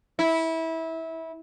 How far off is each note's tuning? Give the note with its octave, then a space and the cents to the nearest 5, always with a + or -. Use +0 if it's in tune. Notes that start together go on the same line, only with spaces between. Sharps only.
E4 -20